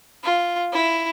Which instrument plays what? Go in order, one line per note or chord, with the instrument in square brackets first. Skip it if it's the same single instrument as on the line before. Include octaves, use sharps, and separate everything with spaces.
[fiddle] F4
E4